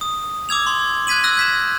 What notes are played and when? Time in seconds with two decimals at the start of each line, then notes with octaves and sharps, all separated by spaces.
0.01 D#6
0.49 D6 E6 G#6 F7
0.67 C6
1.07 F#6 G#6 B6 D#7 F#7
1.24 E6 F#6 A#6
1.37 G6 B6 E7